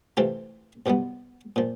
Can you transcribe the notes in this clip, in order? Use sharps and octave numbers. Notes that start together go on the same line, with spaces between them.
C3 E3 A3 C4 F4
C2 B2 G3 B3
A#2 F3